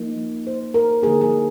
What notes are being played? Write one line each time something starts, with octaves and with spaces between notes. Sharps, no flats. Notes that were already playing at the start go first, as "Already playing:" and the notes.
Already playing: F3 A#3 D#4
C5
A#4
D3 F3 A#3 D#4 G#4
G#4